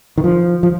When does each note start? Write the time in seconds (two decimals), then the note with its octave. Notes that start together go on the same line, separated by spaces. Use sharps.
0.18 D#3
0.24 F3
0.63 F3